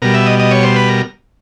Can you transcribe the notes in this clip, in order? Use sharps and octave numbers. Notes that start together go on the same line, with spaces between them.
B2 G3 A#4
E5
D#5
D#5
C#5
C5
B4
A#4